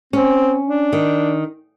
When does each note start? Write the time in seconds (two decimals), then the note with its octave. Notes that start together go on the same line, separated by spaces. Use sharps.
0.13 C4 C#4
0.67 D4
0.93 D#3